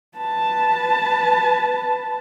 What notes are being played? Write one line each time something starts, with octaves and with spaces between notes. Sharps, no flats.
B4 A5